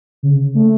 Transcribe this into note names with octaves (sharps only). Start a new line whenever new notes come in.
C#3
A3